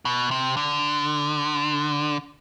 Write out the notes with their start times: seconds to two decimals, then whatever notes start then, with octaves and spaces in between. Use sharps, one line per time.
0.05 B2
0.31 C3
0.57 D3